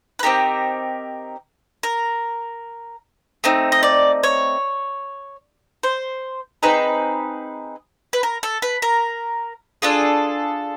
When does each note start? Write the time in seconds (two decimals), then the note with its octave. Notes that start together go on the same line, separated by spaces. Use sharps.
0.19 B4
0.23 C4 D#4 G4 A#4
1.83 A#4
3.44 A3 C4 D#4
3.72 D#5
3.83 D5
4.23 C#5
5.83 C5
6.63 C4 D#4 G#4 B4
8.13 B4
8.23 A#4
8.43 A4
8.62 B4
8.82 A#4
9.82 D4 F4 G#4 A4